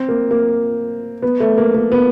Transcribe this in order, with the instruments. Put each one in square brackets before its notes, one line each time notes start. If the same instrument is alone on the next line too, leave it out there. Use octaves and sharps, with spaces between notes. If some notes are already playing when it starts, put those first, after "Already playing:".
Already playing: [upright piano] C4
A#3
A#3
B3
A3
A#3
A#3
B3